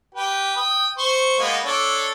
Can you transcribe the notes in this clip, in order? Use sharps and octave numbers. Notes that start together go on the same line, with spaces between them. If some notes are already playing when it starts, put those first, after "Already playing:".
G4 B4 G5
G5 D#6
C5 C#6
G#3 A#3 B3
D4 A4 C#5